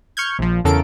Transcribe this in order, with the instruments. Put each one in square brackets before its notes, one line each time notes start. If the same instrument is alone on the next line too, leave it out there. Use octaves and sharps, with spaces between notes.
[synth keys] C#6 F6 G6 G#6
A#1 F3
E2 C#3 A4 A#4 D7